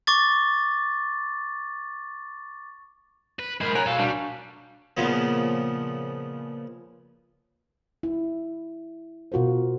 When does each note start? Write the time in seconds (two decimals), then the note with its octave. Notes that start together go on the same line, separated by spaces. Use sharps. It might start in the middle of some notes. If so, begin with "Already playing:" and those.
0.07 C#6 D6 A6
3.39 B4
3.61 G#3 G#4 A#4 C5 B5
3.75 A#4 C#5 F#5 G#5
3.87 B1 F#4 A4 F5
3.99 G3 D4
4.97 A#2 C#3 F3 B3
8.03 E4
9.32 B2 F4 F#4 A#4 C5